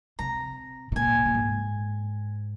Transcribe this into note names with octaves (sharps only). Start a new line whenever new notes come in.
C3 A#5
C3
A#2 G#5
A#2
G#2